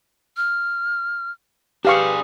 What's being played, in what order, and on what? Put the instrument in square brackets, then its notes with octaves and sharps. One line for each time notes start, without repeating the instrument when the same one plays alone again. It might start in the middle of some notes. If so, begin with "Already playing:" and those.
[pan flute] F6
[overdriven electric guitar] D4 G#4 [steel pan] G4 F5 C#6 [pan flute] B4